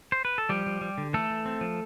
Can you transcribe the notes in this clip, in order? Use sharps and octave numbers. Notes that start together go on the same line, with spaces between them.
C5
B4
A4
F3 G3 G4
F3
G3
D3
E3 A3 A4
E3
C4
F3